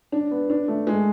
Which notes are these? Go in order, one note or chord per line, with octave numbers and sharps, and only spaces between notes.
D4
B3
D4
A3
G#3